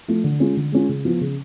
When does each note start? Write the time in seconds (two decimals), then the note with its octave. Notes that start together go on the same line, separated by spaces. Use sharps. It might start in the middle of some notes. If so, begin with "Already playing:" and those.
0.08 F3 A3 F4
0.24 D3
0.40 G#3 C#4 F4
0.57 D3
0.72 G#3 C#4 F4
0.89 C#3
1.05 F3 B3 F4
1.21 C#3